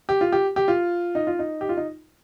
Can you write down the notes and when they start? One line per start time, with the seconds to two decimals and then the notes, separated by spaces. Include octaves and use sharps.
0.09 G4
0.21 F4
0.32 G4
0.56 G4
0.68 F4
1.15 D#4
1.27 F4
1.39 D#4
1.61 G4
1.69 F4
1.77 D#4